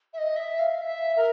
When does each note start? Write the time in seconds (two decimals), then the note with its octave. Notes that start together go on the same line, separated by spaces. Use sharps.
0.13 E5
0.18 D#5
0.36 E5
0.59 F5
0.82 E5
1.16 A#4